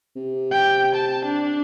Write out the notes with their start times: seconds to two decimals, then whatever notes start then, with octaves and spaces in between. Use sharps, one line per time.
0.16 C3
0.52 G5
0.96 A5
1.26 D4